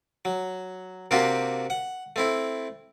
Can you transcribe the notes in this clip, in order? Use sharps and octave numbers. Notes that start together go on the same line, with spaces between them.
F#3
C3 A#3 C4 D4 F#4 G4
F#5
A3 C4 E4